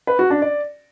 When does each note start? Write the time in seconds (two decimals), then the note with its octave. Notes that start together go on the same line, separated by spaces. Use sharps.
0.07 B4
0.19 F#4
0.30 D4
0.42 D5